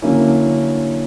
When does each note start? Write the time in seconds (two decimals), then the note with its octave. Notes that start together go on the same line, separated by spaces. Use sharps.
0.02 D3 F#3 A#3 C#4 E4